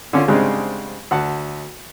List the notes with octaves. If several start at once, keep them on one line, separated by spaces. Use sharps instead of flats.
D3 C#4 F4
G#2 C#3 G3 G#3 C4 D4
D2 F#5 A5